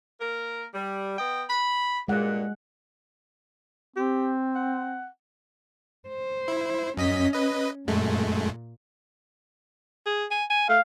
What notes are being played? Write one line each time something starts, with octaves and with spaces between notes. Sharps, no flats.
A#3 A#4
G3
B3 D#5 G5
B5
G2 A#2 G#3 F#5
C4 G4
F#5
C5
E4
F#2 C#4 D#5 B6
B4 D#5
F#2 A#2 G#3 A3
G#4
G#5
G#5
A3 F5